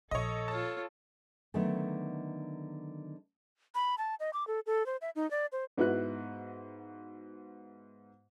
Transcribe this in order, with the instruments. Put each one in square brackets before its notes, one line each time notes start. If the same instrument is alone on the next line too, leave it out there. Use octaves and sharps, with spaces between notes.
[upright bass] A#1 [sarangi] A4 [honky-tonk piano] C#5 D#5
[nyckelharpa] F4 C#5 [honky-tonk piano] A5
[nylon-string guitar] D3 D#3 F#3 A3 B3 D#4
[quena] B5
A5
D#5
D6
A4
A4
C5
E5
D#4
D5
C5
[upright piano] G#2 B3 E4 F#4 F#6